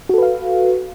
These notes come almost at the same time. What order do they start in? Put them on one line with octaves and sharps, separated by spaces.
F#4 A4 B4 F5